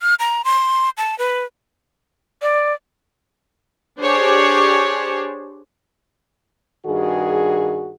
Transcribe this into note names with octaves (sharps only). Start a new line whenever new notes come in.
F6
A#5
C6
A5
B4
D5
D4 G4 G#4 C5 C#5
G2 D#3 F#4 G#4